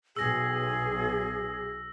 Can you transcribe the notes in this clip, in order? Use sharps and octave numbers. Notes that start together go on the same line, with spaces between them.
B1 G#4 E6 A#6